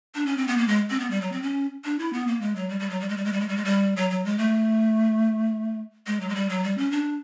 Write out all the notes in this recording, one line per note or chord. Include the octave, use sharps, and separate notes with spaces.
D4
C#4
C4
B3
A#3
G#3
C4
B3
G3
F#3
C4
C#4
D4
E4
B3
A#3
G#3
F#3
G3
G3
F#3
G3
G#3
G3
G#3
G3
G#3
G3
G#3
G3
F#3
F#3
G#3
A3
G#3
F#3
G#3
G3
F#3
G3
C#4
D4